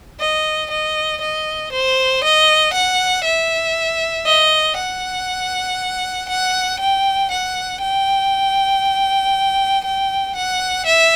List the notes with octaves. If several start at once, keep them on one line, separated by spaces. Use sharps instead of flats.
D#5
D#5
D#5
C5
D#5
F#5
E5
D#5
F#5
F#5
G5
F#5
G5
G5
F#5
E5